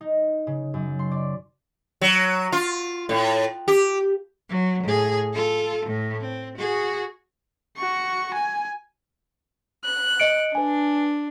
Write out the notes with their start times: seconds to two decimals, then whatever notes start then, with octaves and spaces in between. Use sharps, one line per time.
0.01 D#4
0.47 C#3
0.74 F#2
0.99 C6
1.11 D5
2.01 F#3
2.52 F4
3.09 A2
3.68 G4
4.49 F#3
4.83 A2 G#4
5.33 F4 A4
5.86 A2
6.20 C4
6.58 F#4 G#4
7.77 F#4 C#6
8.34 G#5
9.85 F#6
10.20 D#5 C#7 D7
10.55 D4 B4 G#5